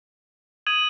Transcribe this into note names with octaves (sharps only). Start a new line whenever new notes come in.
D#6 G#6 D#7 F#7